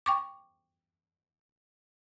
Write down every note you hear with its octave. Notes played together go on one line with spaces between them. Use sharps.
G5 C#6 D6